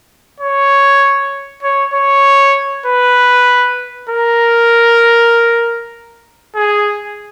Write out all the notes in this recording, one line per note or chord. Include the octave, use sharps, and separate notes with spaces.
C#5
C#5
C#5
B4
A#4
G#4